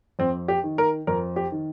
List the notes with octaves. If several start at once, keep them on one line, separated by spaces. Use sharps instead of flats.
F2 C4
G4
D#3
A#4
F2 A#4
G4
D#3